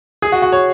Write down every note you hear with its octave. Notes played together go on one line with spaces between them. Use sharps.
G#4
F#4
F#4
C#5